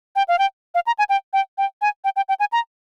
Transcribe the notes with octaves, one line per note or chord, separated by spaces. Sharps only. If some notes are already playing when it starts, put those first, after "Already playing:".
G5
F5
G5
F5
A#5
G#5
G5
G5
G5
G#5
G5
G5
G5
G#5
A#5